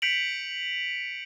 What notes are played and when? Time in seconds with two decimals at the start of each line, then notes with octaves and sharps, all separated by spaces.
0.02 G6 B6 C#7 D7 F7 F#7